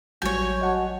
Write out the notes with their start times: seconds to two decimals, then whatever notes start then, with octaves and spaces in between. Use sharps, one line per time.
0.22 A1 F#3 G3 F#4 C#5 G#5 G6 A6
0.61 F#4 D#5 F#5 A5